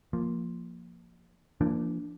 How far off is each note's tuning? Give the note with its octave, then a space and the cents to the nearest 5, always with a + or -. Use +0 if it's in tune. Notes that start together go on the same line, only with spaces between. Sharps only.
F3 +0 A#3 +0
F3 -40 A#3 +0 D4 +0